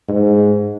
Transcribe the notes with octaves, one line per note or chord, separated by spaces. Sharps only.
G#2